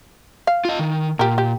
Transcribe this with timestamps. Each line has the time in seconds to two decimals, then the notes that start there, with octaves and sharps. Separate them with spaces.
0.47 F5
0.65 F4 D#5
0.79 D#3
1.19 A#2 G4 A#4
1.38 G4